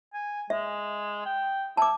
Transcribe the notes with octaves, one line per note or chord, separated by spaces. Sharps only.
G#5
G#3 E5
G5
E4 A5 D6